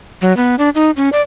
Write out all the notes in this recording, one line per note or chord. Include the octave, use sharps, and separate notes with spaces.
F#3
B3
D4
D#4
C#4
D5